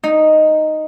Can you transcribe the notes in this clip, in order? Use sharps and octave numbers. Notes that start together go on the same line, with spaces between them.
D#4